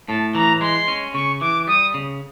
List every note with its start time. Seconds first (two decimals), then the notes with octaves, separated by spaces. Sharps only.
0.08 A2 A5
0.35 E3 A#5
0.61 G#3 C6
0.88 C#4
1.14 C#3 C#6
1.41 E3 D6
1.67 G3 D#6
1.94 C#3